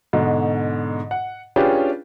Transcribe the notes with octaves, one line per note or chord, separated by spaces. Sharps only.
G#2 B2 D3
F#5
C#4 D4 F4 G4 G#4 B4